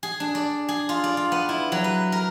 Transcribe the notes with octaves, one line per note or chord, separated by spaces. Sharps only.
G#4
D4
D5
G#4
F4
D5
F4
B3
E4
F#3
B4
A#4